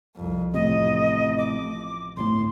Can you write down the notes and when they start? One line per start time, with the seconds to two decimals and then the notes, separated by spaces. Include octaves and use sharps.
0.16 C2 F2
0.54 A1 F2 A2 C3 D#5
1.38 D6
2.17 D1 G1 A2 C6